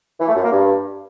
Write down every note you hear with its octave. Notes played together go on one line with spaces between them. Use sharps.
E3
A3
F#2
A#3
G2